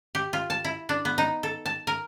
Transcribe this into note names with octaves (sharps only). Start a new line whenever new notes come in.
G4
F4
A5
E4
D4
B3
D#4
A4
A5
A#4